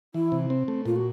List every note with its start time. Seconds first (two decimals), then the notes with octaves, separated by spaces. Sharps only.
0.14 E3 E4
0.32 C3
0.50 C4
0.68 A3
0.85 A#2 F4
0.96 F#4